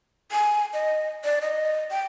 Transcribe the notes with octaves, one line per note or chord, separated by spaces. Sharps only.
G#5
D#5
D5
D#5
G5